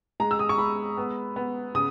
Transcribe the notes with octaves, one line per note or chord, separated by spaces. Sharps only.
G#3 A#5
E6
D#6
C#6
G#3 B5
B3
B3
C#3 D#6